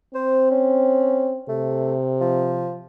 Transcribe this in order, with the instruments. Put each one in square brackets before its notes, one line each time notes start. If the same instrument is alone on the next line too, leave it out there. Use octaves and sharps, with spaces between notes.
[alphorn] C4 [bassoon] C5
[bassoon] C#4
[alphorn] C3 [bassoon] A3
[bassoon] F3